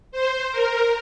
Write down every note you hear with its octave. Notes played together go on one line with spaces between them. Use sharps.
C5
A#4